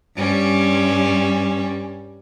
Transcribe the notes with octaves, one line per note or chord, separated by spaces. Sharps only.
G2 G3 C#4